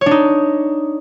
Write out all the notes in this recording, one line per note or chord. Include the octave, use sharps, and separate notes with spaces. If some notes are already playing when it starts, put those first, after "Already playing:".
D4 D#4 C#5